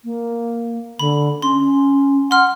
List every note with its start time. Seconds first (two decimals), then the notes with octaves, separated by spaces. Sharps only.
0.05 A#3
0.99 D3 B5
1.42 C#4 C6
2.31 F#5 C6 F6